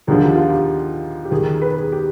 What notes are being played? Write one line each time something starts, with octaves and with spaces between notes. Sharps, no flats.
D#2 D3 F3 G#4
G4
F4
G4
G4
D#2 D#3 G#4
G#4
B4
G#4
G4